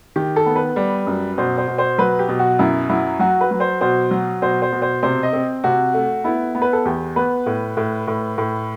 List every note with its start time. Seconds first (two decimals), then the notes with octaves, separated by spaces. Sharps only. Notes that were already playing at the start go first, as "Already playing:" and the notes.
0.16 D#3 G4
0.36 A4
0.46 B3
0.56 B4
0.76 G3
1.07 F#2
1.38 B2 C5
1.58 C5
1.68 B2
1.78 C5
1.98 F#3 B4
2.19 G4
2.29 B2
2.39 F#4
2.59 F#2 E4
2.89 F#3 E4
3.20 F#3 F#4
3.41 B4
3.51 F#3
3.60 C5
3.81 B2 C5
4.11 F#3
4.42 B2 C5
4.62 C5
4.72 B2
4.82 C5
5.03 C3 C5
5.23 D#5
5.33 C4
5.64 C3 F#4
5.94 A3
6.24 B3 E4
6.55 B3
6.62 B4
6.73 A4
6.85 E2 G4
7.16 B3 B4
7.46 A2
7.77 A2
8.07 A2
8.38 A2